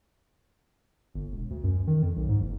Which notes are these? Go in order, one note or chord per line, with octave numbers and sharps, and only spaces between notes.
G1
E1
D2
F#2
D#3
F2
B1
G#2
F#1